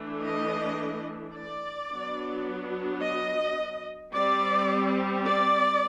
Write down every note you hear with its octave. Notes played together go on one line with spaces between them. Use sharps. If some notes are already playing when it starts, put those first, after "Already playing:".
Already playing: E3 A3 D4
D#5
D5
F#3 B3 D4
D#5
G3 C4 D5
D5